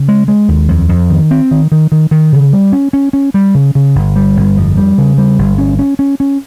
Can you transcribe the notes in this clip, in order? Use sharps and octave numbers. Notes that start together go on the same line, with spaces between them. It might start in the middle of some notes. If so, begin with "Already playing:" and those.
Already playing: C#3
G#3
G#3
D#2
F2
F2
D#3
C4
D#3
D#3
D#3
D#3
C#3
G3
C#4
C#4
C#4
G3
C#3
C#3
G1
G3
G1
F2
G3
C#3
G3
G1
C#4
C#4
C#4
C#4